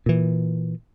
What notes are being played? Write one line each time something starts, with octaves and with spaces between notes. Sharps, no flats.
A#2 E3